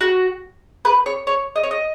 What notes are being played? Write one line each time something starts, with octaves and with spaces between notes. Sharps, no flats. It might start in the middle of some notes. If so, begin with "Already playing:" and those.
F#4
B4
C#5
C#5
D#5
C#5
D#5